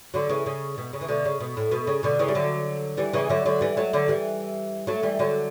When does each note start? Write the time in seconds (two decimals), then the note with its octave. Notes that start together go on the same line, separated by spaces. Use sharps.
0.14 D3 F#3
0.29 C#3 E3
0.46 C#3
0.78 B2
0.93 C#3
1.01 E3
1.09 B2 D3
1.25 C#3
1.40 B2
1.57 A2
1.71 B2
1.87 C#3
2.03 B2 D3
2.19 C#3 E3
2.28 G3
2.35 D3 F#3
2.97 E3 G3
3.13 C#3 E3
3.29 D3 F#3
3.46 D3 F#3
3.61 E3 G3
3.77 F#3 A3
3.93 D3 F#3
4.08 E3 G3
4.87 F#3 A3
5.03 E3 G3
5.19 D3 F#3